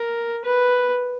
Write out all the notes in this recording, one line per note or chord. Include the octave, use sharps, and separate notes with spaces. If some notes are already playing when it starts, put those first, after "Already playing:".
Already playing: A#4
B4